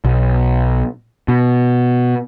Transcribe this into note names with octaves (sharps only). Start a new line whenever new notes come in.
B1
B2